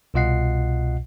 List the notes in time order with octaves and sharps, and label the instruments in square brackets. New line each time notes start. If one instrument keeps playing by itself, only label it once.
[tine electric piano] C2 B2 F4 D#5 F#5 C7